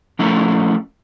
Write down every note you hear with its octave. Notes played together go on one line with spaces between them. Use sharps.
F3 A3 C#4 E4 A4 A#4